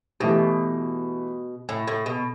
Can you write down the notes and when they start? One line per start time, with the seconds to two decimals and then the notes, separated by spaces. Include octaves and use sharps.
0.20 B2 E3 A3 E4 G4
1.69 A2
1.87 A2
2.06 B2